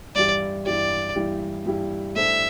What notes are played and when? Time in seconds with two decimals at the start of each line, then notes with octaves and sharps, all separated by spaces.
0.15 G2 E3 G3 E4 G4 D5
0.66 G2 E3 G3 E4 G4 D5
1.16 G2 E3 G3 E4 G4
1.66 G2 E3 G3 E4 G4
2.16 A2 G3 D4 A4 C5 E5